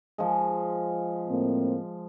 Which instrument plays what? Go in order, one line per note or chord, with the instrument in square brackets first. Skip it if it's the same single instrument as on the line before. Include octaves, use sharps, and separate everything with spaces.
[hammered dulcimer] F3 G#3
[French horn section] A2 A#3 C4